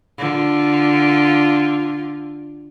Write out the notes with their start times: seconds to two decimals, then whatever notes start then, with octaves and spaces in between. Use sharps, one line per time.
0.19 D3 F4